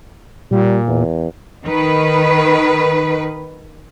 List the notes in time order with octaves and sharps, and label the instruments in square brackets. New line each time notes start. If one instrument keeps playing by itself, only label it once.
[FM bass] A#2 [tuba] G3
[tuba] E2
[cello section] D#3 B4